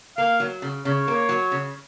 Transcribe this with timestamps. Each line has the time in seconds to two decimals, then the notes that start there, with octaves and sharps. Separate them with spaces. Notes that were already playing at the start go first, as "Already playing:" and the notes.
0.17 A#3 F5
0.40 F#3
0.62 C#3
0.85 C#3 C#5
1.08 A#3
1.29 F#3
1.52 C#3